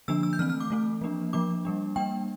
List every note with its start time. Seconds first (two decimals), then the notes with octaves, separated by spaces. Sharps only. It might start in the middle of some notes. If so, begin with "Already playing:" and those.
0.08 D3 F3 A#3 D4 E6
0.23 E6
0.33 G6
0.39 E3 A3 C4 F6
0.50 F6
0.60 D6
0.70 E3 A3 C4
1.01 F3 A#3 D4
1.33 F3 A#3 D4 D6
1.65 G3 A#3 D4
1.96 G3 A#3 D4 G5